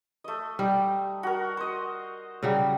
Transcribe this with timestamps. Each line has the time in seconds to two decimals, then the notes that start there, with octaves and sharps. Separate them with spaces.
0.24 A3 D#5
0.59 G3 D#4
1.23 F#4 A#4
1.57 C5 D#5
2.43 C#3 F#3 G3